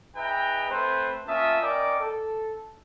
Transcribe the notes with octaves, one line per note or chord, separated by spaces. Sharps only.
D#4 G#4 B4 E5 G5 A#5
A3 C4 B4 C5
A#3 C#4 F4 E5 A5 D#6
C#4 A#4 D5 D#5 G5 D6
A4